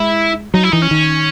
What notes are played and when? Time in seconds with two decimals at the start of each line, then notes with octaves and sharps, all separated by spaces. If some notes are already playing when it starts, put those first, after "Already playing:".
Already playing: G#3 E4
0.54 F#3 D#4
0.63 E4
0.72 E3 D#4
0.82 C#4
0.91 D#3